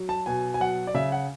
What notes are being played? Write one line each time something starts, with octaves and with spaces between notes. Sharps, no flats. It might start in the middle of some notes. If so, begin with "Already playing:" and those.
Already playing: F#3
A5
B2 G#5
G#5
F#3 F#5
D5
C#3 E5
F#5